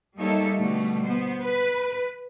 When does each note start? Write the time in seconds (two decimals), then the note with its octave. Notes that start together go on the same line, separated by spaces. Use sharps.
0.18 G3 A#3 D#4 A4 C#5 E5
0.58 B2 D3 G3 A3
1.05 B3 C5
1.44 B4